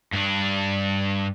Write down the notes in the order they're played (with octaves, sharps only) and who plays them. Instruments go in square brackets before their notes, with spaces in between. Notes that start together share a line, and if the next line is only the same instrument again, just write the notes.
[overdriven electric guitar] G2 D4